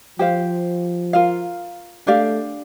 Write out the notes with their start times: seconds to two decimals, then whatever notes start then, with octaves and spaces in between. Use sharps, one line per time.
0.19 F3 G4 C5 F5
1.13 F4 A#4 F5
2.07 A3 D4 G4 D5 F5